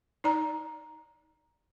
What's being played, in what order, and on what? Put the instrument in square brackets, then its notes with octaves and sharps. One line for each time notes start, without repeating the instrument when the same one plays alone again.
[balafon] D#4 D5 A#5